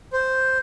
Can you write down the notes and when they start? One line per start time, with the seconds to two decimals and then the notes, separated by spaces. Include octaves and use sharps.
0.13 C5